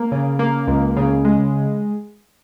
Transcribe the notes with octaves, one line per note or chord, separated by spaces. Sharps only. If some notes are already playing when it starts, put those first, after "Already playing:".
Already playing: A#3
C#3
A#3
C#2
C#3
G#3